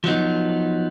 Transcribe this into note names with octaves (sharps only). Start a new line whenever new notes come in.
F3 F#3 B3 D#4